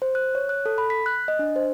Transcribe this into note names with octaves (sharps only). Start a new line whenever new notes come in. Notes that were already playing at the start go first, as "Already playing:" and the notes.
C5
F#6
C#5
F#6
A4
B5
B6
F#6
D#5
D4
C5